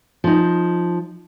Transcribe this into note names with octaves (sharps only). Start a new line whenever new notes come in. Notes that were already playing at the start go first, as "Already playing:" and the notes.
F3 D#4